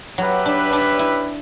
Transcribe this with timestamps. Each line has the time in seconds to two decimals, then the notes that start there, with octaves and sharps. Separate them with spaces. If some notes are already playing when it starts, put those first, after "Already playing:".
0.18 F#3 C#4 G4 B4 E5
0.46 D4
0.73 D4
0.99 E4